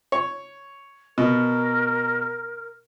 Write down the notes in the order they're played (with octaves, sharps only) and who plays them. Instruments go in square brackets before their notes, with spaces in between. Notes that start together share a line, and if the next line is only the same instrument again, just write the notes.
[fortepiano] C#5
[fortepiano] B2 [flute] A#4